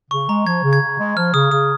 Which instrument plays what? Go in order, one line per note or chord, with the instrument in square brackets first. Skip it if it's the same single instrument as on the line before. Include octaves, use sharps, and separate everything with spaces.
[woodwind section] C#3 [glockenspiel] C#6
[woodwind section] G#3 [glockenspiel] A#5
[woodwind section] F3 [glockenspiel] G#6
[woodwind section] C#3
[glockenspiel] G#6
[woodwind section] C#3
G#3
[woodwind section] F3 [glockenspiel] F6
[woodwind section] C#3 [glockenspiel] D#6
[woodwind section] C#3 [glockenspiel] D#6